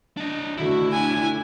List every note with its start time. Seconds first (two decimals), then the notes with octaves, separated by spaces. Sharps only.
0.17 D4 D#5
0.58 D3 A3 E4 F#4
0.92 D4 G#5